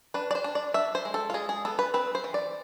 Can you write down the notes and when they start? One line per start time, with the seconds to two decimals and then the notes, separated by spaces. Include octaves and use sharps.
0.14 D4 B4
0.31 D5
0.35 C5
0.44 D4
0.55 D5
0.74 D4 E5
0.95 C5
1.05 G#3
1.14 A4
1.30 F4
1.34 G#3 G#4
1.49 G#4
1.65 B3 A4
1.79 B4
1.94 C4 B4
2.15 C5
2.24 E3
2.34 D5